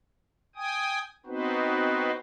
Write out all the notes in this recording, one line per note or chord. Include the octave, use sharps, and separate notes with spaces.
G5 G#5 D#6
B3 C4 D#4 F#4 B4 C5